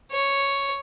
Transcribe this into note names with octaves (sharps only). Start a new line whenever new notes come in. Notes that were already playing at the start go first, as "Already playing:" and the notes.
C#5